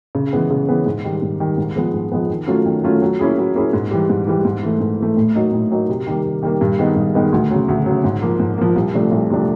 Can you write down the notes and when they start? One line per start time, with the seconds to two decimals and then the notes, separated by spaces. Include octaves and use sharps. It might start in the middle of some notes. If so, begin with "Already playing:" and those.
0.15 C#3
0.33 E3 G#3 B3
0.51 C#3
0.69 E3 G#3 B3
0.86 G#2
1.04 D#3 G3
1.22 G#2
1.40 D#3 G3
1.57 G#2
1.76 F3 G#3 B3
1.94 G#2
2.12 F3 G#3 B3
2.30 D#3
2.47 F#3 A3 C#4 F4
2.66 D#3
2.83 F#3 A3 C#4 F4
3.02 F#3
3.19 A#3 C#4 E4 G#4
3.38 F#3
3.55 A#3 C#4 E4 G#4
3.73 G#2
3.91 E3 G3
4.10 G#2
4.27 E3 G3
4.45 G#2
4.63 E3 A3
4.81 G#2
4.99 E3 A3
5.17 A2
5.35 F#3 A#3 D#4
5.53 A2
5.71 F#3 A#3 D#4
5.89 C3
6.07 D#3 G3 A#3
6.25 C3
6.43 D#3 G3 A#3
6.61 G2
6.79 D#3 G#3 B3 D#4
6.96 G2
7.14 D#3 G#3 B3 D#4
7.32 D2
7.50 C#3 F#3
7.68 D2
7.86 C#3 F#3
8.04 G#2
8.22 F3 A#3
8.40 G#2
8.58 F3 A#3
8.76 C2
8.94 C3 F3 A3 D4
9.11 C2
9.30 C3 F3 A3 D4